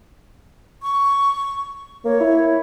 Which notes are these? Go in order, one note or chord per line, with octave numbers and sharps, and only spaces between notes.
C#6
A#3 C#5
E4